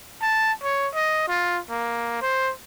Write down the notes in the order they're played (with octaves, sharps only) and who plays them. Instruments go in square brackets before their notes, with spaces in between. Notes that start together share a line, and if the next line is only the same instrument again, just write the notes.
[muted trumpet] A5
C#5
D#5
F4
A#3
C5